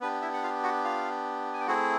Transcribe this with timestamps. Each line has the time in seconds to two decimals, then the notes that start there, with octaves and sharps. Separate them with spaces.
0.01 B3 D4 G4 B4
0.21 E4 E5
0.33 F#5
0.43 F4 F5
0.63 F#4 F#5
0.85 F4 F5
1.54 G#5
1.60 G5
1.67 A3 C4 E4 F#4 G#4 F#5